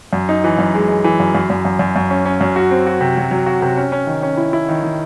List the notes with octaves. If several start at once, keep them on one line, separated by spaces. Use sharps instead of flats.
F#2
D#4
E3
F#2
G#3
G#3
E3
F#2
F#2
F#2
F#2
F#2
F#2
C#4
C#4
F#2
F#4
C4
F#4
C3
F#3
F#3
F#4
C3
C#4
C#4
D#3
C#4
E4
E4
D#3
D#3